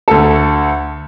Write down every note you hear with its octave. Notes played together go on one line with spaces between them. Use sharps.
D2 A4